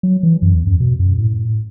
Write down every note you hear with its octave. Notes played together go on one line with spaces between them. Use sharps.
F#3
E3
F#2
E2
F#2
B2
F#2
A2